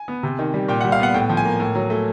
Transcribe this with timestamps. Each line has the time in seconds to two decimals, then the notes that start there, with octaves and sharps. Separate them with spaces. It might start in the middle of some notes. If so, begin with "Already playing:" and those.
Already playing: G#5
0.08 B3
0.23 C3
0.39 D#3
0.54 G3
0.68 A#2 G5
0.81 F#5
0.84 G3
0.92 F5
1.00 B3 F#5
1.14 A2 G5
1.29 F3
1.37 G#5
1.45 A#3
1.60 A2
1.75 F#3
1.90 A3